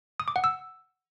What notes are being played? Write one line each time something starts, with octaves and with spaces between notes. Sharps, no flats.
D#6
D6
F#5
E6